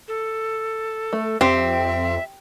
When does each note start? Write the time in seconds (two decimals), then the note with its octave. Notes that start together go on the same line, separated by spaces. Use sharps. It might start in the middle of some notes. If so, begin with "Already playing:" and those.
0.08 A4
1.13 A3
1.41 F2 C4 G4 E5